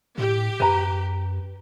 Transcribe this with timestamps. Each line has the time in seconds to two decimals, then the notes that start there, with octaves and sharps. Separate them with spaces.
0.18 A2 G4
0.60 F#2 B4 A#5